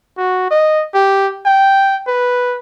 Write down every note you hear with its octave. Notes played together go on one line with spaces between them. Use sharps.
F#4
D#5
G4
G5
B4